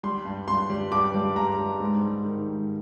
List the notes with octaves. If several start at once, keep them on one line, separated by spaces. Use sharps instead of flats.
G3 C6
G2
G2 C6
G3
G2 D6
G3
G2 A#5
G3
G#2
G3
D#3
G#2